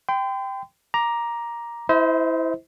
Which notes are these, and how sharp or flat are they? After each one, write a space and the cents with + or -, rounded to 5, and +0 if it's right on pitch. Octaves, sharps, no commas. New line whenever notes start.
G5 +0 C6 -40
A#5 +10 D6 +5
E4 -10 C5 -20 D#5 +45